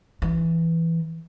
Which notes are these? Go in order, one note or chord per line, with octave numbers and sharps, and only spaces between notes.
E3